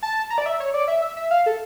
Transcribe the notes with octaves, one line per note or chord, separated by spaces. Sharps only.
A5
A#5
D5
E5
C#5
D5
E5
E5
E5
F5
A4